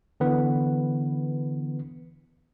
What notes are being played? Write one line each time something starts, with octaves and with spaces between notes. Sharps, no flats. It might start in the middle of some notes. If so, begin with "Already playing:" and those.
D3 E3 B3 B4